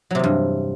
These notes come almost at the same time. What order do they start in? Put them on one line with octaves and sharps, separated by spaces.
F#3 C3 E2 G2